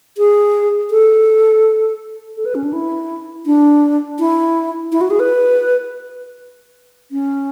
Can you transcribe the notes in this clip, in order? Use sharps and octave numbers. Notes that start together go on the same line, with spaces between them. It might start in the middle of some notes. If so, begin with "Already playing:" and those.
G#4
A4
A4
B4
C#4
D4
E4
D4
E4
E4
F#4
G#4
B4
C#4